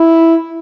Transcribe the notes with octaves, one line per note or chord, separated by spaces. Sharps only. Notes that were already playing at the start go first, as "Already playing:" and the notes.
Already playing: E4